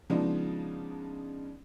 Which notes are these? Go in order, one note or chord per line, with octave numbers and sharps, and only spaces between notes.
C#3 F3 G#3 B3 D4 D#4